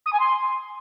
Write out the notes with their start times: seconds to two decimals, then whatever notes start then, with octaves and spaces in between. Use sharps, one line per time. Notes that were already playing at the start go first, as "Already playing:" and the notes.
0.06 D#6
0.13 G#5
0.20 C6